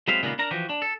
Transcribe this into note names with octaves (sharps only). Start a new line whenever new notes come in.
F#3 G#3 B3 C4 E5 F5
D#2 A#2 C#3 G#3 A#3 B3
D4 A#4 A#5
E3 F3 F#4 G4
D4
A4